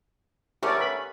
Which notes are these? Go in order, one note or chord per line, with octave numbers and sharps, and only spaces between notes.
D3 A3 C#4 G4 A#4 D5
B4 B5